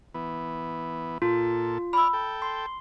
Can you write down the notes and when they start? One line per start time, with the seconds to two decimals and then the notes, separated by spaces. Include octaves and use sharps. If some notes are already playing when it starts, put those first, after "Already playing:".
0.14 E3 B3
1.22 A#2 F4 A4
1.93 D5 B5 E6 F6
2.13 A4 G5
2.42 C6